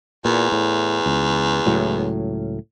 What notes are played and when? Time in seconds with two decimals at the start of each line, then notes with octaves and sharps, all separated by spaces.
0.25 E2 A#2
0.52 A2
1.06 C#2
1.66 C#2 A2 F#3